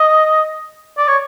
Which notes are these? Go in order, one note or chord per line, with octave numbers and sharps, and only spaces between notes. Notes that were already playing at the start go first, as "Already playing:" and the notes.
Already playing: D#5
D5
C#5